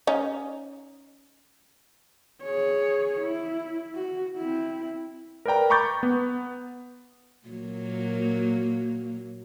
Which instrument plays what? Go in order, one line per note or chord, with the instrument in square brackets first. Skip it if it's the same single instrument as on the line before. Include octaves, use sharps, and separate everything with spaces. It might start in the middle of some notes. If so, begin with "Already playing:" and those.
[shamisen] C#4 D#4
[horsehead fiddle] G#4 C#5
E4
F#4
C4 E4
[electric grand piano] A#4 B4 D5 G5 A#5
A#5 B5 C#6 D6 G6 A6
B3
[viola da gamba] A#2 F#3 A#3